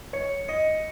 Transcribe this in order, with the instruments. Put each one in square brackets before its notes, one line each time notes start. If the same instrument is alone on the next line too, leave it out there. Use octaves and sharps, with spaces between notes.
[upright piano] C#5 [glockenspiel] C#7
[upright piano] D#5 [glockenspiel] C#7